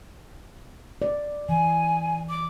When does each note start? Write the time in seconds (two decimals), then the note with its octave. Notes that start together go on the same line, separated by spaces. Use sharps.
1.02 D5
1.49 E3 G#5
2.29 D6